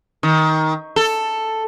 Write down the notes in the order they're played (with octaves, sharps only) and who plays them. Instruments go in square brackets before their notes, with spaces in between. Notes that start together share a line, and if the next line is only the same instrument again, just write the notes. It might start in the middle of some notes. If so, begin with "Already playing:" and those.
[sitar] D#3
A4